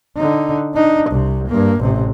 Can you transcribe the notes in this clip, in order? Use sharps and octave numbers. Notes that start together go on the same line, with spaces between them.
D3 D#4
D4 D#4
C2 C3
G2 A#3
A1 C3